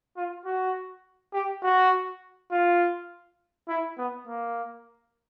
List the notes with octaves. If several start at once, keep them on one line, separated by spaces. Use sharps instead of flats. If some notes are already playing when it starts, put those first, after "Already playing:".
F4
F#4
G4
F#4
F4
E4
B3
A#3